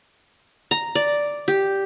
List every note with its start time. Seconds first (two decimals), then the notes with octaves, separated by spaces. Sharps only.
0.71 A#5
0.95 D5
1.48 G4